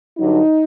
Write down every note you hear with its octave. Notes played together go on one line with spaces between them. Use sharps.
G2 D3 F#3 D#4